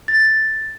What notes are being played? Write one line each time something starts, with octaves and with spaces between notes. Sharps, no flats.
A6